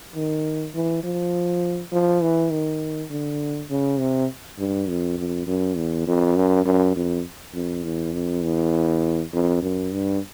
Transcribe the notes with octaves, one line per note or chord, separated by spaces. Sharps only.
D#3
E3
F3
F3
E3
D#3
D3
C#3
C3
G2
F2
F2
F#2
E2
F2
F#2
F#2
F2
F2
E2
F2
E2
F2
F#2
G2